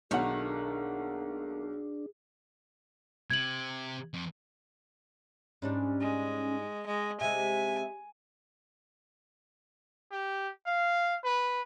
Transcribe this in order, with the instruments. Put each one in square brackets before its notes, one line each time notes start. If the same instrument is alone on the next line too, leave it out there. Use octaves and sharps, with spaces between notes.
[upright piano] B1 F#5 [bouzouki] D#3 A3 A#3 [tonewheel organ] D4 [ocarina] G#4
[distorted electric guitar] C3 [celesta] G#6 F#7
[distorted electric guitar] F2
[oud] G#2 G3 D4 [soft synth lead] C#4
[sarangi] G#3
[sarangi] G#3 [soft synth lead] D#5
[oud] C3 G#3 [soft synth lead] E5 [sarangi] G#5
[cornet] G4
F5
B4